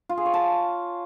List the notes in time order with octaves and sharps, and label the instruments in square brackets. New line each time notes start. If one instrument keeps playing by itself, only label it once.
[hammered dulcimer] F4
G#4
C#5
A5